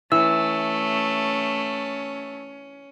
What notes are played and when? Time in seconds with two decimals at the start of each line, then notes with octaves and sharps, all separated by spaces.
0.12 E3 A3 C#4 E6